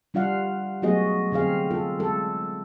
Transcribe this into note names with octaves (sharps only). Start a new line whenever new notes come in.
G3 D4 F4 F5 F#5
F#3 A3 B3 F#4 G#4 D#5
D3 C4 G#4 F5
F4 A4
G#3 A4